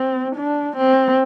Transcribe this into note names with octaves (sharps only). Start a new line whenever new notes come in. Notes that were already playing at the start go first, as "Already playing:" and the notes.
Already playing: C4
D4
C4